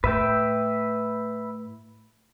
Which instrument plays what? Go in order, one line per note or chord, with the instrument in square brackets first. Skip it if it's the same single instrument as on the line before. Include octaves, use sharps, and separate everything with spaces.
[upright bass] A2 [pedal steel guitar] B4 E5 G5